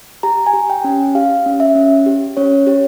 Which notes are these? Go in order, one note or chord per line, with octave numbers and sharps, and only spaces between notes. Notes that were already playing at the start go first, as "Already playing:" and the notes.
G4 A#5
G#5
G4
G5
C#4
G4 F5
C#4
E5
C#4
G4
C#4 C#5
G4 C#5